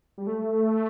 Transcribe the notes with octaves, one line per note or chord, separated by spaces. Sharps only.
G3
A3